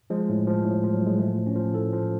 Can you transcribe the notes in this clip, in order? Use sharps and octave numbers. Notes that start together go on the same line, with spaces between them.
F3 G#3
A2
F3
A2
F3
F#3
A2 G#3
F3 A3
A2
C#4
F3
A2 A4
F3